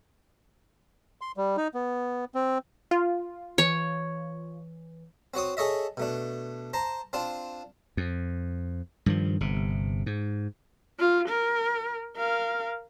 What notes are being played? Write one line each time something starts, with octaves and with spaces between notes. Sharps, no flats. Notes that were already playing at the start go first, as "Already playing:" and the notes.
C6
G3
D#4
B3
C4
F4
E3 C#5
C4 F#4 C#5 D#6
G#4 A4 C#5 D#5 E5
B2 A3 D4
C5 A5 A#5
C4 D4 F4 A5
F2
G2 D#3 F3
G1 C3
G#2
F4
A#4
A#4 F5